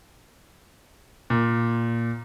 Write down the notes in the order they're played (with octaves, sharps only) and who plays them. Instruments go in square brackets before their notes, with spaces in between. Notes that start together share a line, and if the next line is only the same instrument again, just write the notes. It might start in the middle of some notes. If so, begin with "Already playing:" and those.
[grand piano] A#2